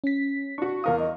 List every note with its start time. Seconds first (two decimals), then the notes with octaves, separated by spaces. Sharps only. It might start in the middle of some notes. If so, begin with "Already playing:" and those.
0.04 C#4 B6
0.58 D4 F#4 C#6
0.84 E2 A#4 F5 D#6
0.99 D#5